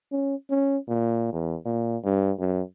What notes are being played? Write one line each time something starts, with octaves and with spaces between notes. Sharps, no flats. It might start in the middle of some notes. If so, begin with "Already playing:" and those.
C#4
C#4
A#2
E2
A#2
G2
F#2